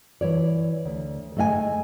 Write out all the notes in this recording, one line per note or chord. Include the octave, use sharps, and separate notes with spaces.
E3 C#5 D5
D2
A3 G#4 D#5 F5 G#5